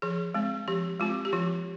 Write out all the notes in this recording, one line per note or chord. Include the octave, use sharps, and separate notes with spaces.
F3 G#4
G#3 C4
F3 G4
G#3 C4 F4
G4
F3 F4